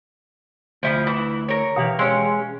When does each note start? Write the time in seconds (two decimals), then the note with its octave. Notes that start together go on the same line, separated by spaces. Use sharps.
0.83 D2 F3 E4 F4
1.07 E3 E4
1.48 A#4 C#5
1.76 B2 E3 G4 F5
1.99 G#3 C#4 C6 E6